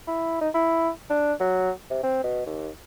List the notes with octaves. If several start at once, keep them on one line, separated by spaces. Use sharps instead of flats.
E4
D#4
E4
D4
F#3
C3
C4
B2
D#2